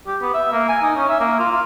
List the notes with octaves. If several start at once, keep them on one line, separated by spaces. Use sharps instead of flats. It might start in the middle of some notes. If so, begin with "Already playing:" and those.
G4
B3
E5
A#3
G#5
D#4
C#4
E5
A#3
F4
F4